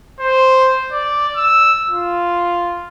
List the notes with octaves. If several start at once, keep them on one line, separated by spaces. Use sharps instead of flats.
C5
D5
E6
F4